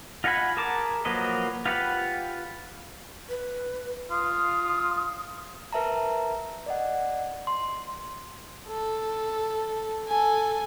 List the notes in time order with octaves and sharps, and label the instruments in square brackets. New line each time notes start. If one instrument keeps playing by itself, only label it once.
[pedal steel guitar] F4 D#5 F#5 G#5 B5
G#4 A#4 A5 D6
F3 F#3 A#3 B4 D#5
F4 G4 B4 F#5 B5
[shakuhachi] B4
[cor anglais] F4 [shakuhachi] D#6
[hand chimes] A#4 B4 E5 A5 A#5
D5 D#5 F#5
C6
[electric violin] A4
A4 G#5